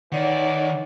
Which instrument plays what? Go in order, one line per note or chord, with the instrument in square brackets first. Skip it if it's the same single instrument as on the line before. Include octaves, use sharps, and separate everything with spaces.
[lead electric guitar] D#3 [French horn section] E3 D5 [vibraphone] D#4 C#5 F#5